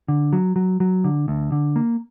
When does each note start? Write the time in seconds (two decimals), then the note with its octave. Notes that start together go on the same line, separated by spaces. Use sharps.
0.08 D3
0.33 F#3
0.56 F#3
0.80 F#3
1.04 D3
1.28 D2
1.52 D3
1.76 A#3